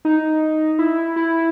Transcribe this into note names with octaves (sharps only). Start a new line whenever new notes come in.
D#4
E4
E4